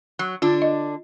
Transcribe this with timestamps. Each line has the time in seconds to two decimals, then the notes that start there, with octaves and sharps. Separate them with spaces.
0.19 F#3 F#6
0.42 D3 D4 F4
0.62 D#5